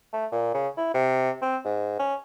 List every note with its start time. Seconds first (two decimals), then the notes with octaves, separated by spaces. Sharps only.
0.13 A3
0.32 A#2
0.54 C#3
0.77 E4
0.94 C3
1.42 C4
1.65 G#2
1.99 C#4